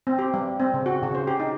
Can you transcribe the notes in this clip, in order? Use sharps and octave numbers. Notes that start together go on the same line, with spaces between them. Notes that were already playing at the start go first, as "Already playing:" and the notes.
C4
G4
G3
C4
C#3
F#4
C#3
C5
G4
D#4